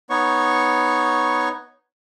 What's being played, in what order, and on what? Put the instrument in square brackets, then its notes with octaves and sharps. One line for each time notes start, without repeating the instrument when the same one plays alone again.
[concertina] B3 D#4 C#5 C#6